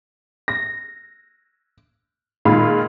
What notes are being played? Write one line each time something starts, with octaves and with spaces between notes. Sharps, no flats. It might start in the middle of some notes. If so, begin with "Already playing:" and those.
A#6
A#2 D#3 G#3 F4 F5 B5